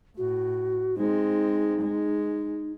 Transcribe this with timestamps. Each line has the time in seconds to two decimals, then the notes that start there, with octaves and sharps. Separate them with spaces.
0.17 A2 F#4
0.98 G#3 C4 D#4
1.82 G#3